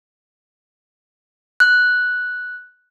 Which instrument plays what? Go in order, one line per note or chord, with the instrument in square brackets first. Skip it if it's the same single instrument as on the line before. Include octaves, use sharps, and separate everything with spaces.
[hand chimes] F#6